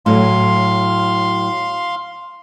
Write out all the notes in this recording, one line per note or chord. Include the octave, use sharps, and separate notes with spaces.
A2 F#3 F5 C6